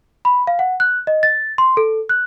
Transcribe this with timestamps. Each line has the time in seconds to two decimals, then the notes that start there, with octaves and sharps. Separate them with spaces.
0.25 B5
0.47 F5
0.59 F#5
0.80 F#6
1.07 D#5
1.23 A6
1.58 C6
1.77 A4
2.09 F#6